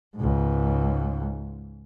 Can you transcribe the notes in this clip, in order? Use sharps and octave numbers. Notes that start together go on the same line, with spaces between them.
C#2 G#2